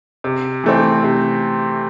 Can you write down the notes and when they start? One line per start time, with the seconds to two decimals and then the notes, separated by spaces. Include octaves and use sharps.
0.24 C3
0.64 E3 A3 C4
1.04 C3